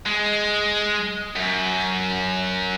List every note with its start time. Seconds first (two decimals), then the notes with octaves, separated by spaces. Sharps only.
0.06 G#3
1.36 F#2